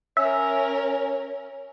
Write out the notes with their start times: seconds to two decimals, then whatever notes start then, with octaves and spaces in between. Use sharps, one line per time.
0.17 C#4 A#4 C#5 E5